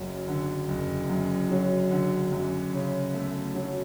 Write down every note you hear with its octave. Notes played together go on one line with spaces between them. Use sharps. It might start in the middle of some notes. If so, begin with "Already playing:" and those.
Already playing: F#1 F#2 F#3
D3
F#1
F#2
F#3
D3
F#2
C#3
A3
F#3